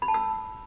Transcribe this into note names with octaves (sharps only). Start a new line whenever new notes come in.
B5
A5
E6